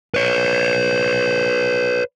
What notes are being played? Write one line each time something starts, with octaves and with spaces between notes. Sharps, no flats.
B4 C#5